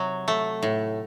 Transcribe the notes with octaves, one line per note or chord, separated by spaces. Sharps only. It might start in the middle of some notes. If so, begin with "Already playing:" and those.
Already playing: C3 F#3
A3
A2